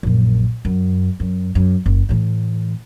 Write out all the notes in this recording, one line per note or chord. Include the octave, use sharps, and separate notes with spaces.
A#1 F#2
F#2
F#2
F#2
F#1
A2 E3